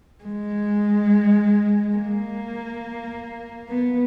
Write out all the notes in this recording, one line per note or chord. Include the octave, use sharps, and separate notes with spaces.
G#3
A#3
B3